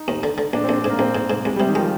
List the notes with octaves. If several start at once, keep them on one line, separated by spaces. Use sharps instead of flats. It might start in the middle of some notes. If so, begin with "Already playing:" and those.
Already playing: D#4
D#2
D3
D3
A#1 D4
C4
A#1 D4
G#2
A#3
A#1 C4
G#2
G#2
C2 G#3
G3
C3
D#3
F3 G#3